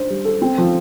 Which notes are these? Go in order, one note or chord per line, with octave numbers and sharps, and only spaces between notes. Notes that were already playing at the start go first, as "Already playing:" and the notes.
Already playing: D4 C5
G3
A4
C4
F3